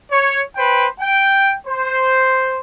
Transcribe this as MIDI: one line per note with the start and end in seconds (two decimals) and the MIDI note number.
0.11 0.41 73
0.56 0.86 71
0.56 0.86 72
0.56 0.86 79
1.00 1.52 79
1.66 2.61 72